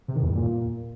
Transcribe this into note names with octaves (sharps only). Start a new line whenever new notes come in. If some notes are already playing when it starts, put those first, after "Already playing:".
C3
D#3
E2
G2
A#2